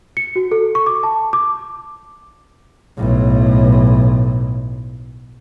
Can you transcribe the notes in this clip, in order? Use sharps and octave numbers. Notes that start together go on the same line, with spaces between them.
C#7
F#4
A4
C#6
D6
A5
D6
B1 A2